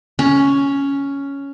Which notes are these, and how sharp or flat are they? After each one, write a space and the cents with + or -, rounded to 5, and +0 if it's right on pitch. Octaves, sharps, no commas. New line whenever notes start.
C#4 +5